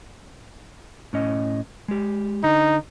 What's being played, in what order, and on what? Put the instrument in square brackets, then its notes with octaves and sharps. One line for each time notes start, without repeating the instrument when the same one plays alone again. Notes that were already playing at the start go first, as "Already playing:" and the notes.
[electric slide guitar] A2 C#4 D#5
G#3 G4
[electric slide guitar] D3 [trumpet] D#4